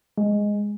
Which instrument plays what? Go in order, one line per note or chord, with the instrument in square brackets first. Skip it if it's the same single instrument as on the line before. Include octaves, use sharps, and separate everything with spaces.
[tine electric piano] G#3